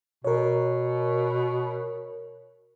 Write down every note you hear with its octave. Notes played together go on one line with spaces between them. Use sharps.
B2 A#4 C#5